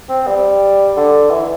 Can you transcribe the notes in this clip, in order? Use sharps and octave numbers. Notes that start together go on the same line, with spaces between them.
C4
G3
D3
E3